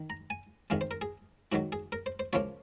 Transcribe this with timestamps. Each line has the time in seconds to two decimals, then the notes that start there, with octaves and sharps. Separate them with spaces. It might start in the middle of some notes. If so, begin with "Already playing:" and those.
Already playing: D#3
0.10 A#5
0.30 G#5
0.70 F2 D#3 G#3 F5
0.81 C5
0.91 A#4
1.01 G#4
1.52 G#2 D#3 F#3 F#4
1.72 G#4
1.92 A#4
2.06 C5
2.19 C5
2.33 C#2 C#3 F3 A#3 F4 C#5